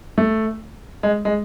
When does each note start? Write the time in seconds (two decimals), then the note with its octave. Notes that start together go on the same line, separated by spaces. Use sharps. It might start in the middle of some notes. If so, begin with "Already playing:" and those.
0.18 A3
1.03 G#3
1.25 G#3